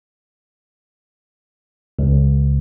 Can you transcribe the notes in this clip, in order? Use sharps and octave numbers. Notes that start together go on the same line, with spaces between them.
C#2